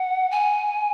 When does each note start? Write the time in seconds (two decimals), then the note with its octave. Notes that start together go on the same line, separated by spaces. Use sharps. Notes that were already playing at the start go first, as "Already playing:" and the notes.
Already playing: F#5
0.31 G#5